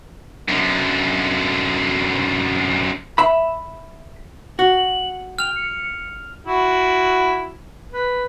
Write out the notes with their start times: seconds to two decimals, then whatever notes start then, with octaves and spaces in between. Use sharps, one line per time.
0.49 F#2 D3
3.18 E5 B5
4.59 F#4 F#7
5.39 G5 F6 F7
5.56 C#7
6.45 E4 F#4
7.92 B4